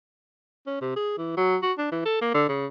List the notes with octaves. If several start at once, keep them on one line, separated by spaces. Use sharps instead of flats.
C#4
C3
G#4
E3
F#3
F#4
D4
E3
A4
A#3
D3
C#3